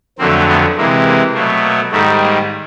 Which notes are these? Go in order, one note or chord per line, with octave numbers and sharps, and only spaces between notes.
F2 D3 F#3 A3 A#3 C4
A3 B3
C3 E3 G#3 A#3
A#3
B2 F#3 A3 A#3
A#3
G#2 D#3 G3 A3
A#3